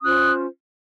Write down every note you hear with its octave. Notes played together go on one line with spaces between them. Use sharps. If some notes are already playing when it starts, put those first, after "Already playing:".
C#4 F4 C5 D#6 F#6